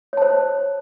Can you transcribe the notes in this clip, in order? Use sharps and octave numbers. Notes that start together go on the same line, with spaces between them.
C5 C#5 A5